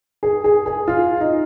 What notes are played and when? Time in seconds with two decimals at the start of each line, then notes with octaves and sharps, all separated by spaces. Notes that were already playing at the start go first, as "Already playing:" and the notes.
0.23 G#4
0.44 G#4
0.66 G#4
0.88 F4
1.20 D#4